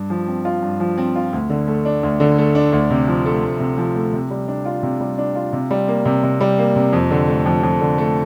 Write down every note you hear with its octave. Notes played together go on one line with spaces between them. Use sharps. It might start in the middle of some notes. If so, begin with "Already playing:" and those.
Already playing: G2
F3
C4
F4
G2
F3
C4
F4
D2
D3
A3
D4
D2
D3
A3
D4
D2
C3
F3
A3
D2
C3
F3
A3
C3
G3
D4
F4
C3
G3
D4
F4
C3
G3
A#3
C3
C3
G3
A#3
C3
F2
D3
A3
F2
F2
D3
A3